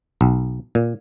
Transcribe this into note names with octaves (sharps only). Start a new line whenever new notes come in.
B1
A#2